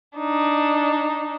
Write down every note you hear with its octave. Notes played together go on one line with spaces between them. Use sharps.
D4 D#4